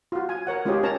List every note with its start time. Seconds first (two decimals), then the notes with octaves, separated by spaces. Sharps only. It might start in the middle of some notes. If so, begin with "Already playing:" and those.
0.12 F4 F#4
0.29 G#5
0.47 A#4 C#5 F#5
0.65 G#3 C#4 F4 G4 G#4 C#5
0.83 C#4 A#4 C#5 A5 A#5